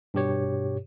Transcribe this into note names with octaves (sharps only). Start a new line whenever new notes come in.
G2 B2 G4 C#5